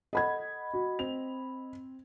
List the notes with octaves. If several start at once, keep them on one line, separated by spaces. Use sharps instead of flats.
A4 D#5 F#5 B5 G#6
F#4
C4 F7